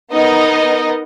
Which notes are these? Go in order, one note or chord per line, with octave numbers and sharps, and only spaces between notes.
B3 D#4 A#4 D#5